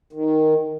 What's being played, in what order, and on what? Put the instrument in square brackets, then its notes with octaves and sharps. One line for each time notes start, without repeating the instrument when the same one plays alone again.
[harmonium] D#3